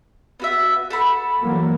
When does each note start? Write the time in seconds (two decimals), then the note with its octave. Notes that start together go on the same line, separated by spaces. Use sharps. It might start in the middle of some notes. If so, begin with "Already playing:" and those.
0.40 B3 F#4 E5
0.90 A4 F#5 B5
1.40 E3 F#3 A#3